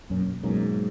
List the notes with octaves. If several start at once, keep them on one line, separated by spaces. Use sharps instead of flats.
F#2 B2 F#3 A#3 C#4
G#2 B2 F#3 A#3 C#4